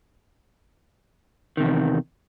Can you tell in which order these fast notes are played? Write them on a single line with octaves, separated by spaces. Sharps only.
D#3 C3 E2